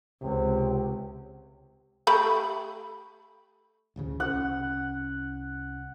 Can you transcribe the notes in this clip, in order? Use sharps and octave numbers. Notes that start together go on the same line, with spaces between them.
C#2 C3
A3 G4 B5
A1 D2 C#3
C2 C#4 F#5